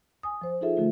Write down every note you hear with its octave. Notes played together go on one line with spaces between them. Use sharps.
G#5 D#6
F3 C5
D#4 F4 G#4 A4 E5
D3 F3 A3 F4